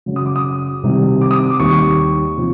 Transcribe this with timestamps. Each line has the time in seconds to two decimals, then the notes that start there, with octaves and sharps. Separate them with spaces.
0.06 F#2 C#3 F#3
0.16 D#6
0.26 D6
0.36 D#6
0.83 C2 C3 D#3 G3
1.21 D6
1.31 D#6
1.40 D6
1.50 D6
1.60 D#2 D#3 G3 C#6
2.37 C3 F3